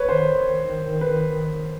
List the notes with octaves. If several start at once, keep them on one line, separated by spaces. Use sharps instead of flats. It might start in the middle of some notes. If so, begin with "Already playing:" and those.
Already playing: B4 C#5
D#3 C5
B4